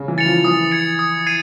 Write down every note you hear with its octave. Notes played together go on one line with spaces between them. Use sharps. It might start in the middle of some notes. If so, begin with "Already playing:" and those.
Already playing: C#3
E3
A6 C#7 F7
F3
E3 D#6
G#6 C#7
D#6
G#6 C7 D#7